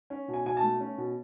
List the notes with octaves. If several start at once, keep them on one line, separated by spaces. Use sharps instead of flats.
C#4
B2
G#5
B2 G#5
A5
A3
C#4
B2